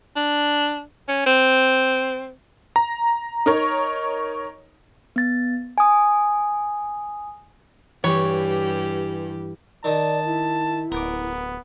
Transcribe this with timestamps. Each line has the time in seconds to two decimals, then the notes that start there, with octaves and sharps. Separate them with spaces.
0.16 D4
1.08 C#4
1.26 C4
2.76 A#5
3.46 D#4 A#4 C#5
5.16 B3 A6
5.78 G#5 D#6
8.04 G2 E3 G4 C#5
9.84 D#3 D5 D#5 A5
10.26 E4
10.92 D1 B3 A#4 D6